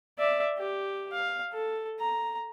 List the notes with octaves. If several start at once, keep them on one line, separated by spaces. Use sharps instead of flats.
D5 E5
G4
F5
A4
A#5